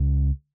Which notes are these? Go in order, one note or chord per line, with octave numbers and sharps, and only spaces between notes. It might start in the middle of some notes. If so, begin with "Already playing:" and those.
Already playing: C#2